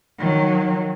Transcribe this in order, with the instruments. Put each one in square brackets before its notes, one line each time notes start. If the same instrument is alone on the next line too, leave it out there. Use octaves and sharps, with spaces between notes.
[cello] D#3 F#3